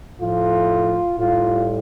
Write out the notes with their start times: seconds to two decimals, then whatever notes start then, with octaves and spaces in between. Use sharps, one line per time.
0.20 A2 F3 A3 F4
1.18 A2 G3 F4